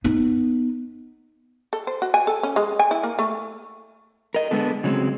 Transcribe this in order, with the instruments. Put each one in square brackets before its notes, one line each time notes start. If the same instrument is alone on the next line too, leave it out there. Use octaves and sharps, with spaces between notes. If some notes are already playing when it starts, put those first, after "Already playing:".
[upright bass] B3 D#4
[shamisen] A4
C5
F#4
G#5
A4
C#4
G#3
G#5
E4
A#3
A3
[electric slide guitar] A#4 D#5
D3 G#3 B3 A4
C#3 F#3 G#3 C4